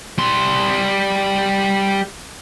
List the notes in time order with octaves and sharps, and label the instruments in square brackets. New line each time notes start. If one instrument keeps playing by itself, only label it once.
[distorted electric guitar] G3 C6